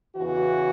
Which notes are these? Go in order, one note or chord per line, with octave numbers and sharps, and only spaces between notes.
E2 C#3 E3 F#4